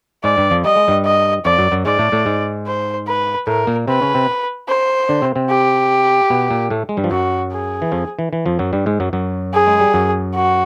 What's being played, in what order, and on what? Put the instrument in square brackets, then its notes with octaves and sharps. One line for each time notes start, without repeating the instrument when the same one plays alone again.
[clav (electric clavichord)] G#2 G#3 [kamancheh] D5
[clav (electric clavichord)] G2 G3
F2 F3
[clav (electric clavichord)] G3 [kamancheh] D#5
[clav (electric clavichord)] G#3
G2 G3
[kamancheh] D#5
[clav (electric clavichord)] F2 F3 [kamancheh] D5
[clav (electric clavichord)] F#2 F#3
F#2 F#3
[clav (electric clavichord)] G#2 G#3 [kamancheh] D5
[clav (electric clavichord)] A2 A3
A2 A3
G#2 G#3
[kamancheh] C5
B4
[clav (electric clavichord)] A2 A3 [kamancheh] A#4
[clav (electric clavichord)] A#2 A#3
[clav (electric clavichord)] C3 C4 [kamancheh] B4
[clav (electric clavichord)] C#3 C#4
C3 C4
[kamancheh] C5
[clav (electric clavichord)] D3 D4
C3 C4
C3 C4
[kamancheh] G4
[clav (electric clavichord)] B2 B3
A#2 A#3
A2 A3
G#3
G2 G3
F3
[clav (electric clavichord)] F#2 F#3 [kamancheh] F#4
[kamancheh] G#4
[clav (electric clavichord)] E3
F2 F3
E3
E3
F2 F3
F#2 F#3
G2 G3
G#2 G#3
F#2 F#3
F#2 F#3
[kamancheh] G#4
[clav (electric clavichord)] G#3
G3
F#2 F#3
[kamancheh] F#4